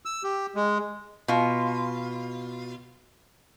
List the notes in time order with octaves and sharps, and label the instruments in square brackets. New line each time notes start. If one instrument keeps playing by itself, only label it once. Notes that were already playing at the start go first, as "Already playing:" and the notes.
[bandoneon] E6
G4
G#3
[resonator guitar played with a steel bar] B2 F4